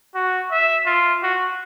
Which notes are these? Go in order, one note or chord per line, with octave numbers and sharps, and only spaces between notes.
F#4
E5
F4
F#4